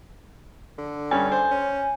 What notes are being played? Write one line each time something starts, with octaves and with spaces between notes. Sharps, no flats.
D3
G2 C#4 G#5
C5
C#4